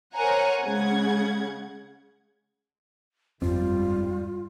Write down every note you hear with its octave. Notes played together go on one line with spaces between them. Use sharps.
A#4 C5 C#5 F#5 G#5 A#5
C#3 G#3 F#5 G#6
G1 F2 G#2 G3 C4 F4